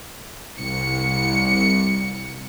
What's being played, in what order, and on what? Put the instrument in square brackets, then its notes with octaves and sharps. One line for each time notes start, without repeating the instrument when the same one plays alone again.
[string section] C2 C#7